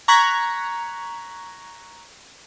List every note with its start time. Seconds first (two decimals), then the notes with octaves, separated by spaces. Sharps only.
0.08 A#5 C#6 F#6 G#6 B6